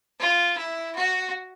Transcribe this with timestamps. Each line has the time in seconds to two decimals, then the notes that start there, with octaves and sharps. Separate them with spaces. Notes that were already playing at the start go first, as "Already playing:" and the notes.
0.19 F4
0.57 E4
0.95 F#4